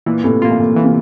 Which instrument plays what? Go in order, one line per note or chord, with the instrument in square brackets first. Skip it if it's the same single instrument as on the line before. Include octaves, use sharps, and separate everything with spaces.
[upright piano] A#2 [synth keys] E3
[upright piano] A2 C3
[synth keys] A#3 F4
[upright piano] A#2
A2
[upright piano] A#2 [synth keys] E3
[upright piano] C3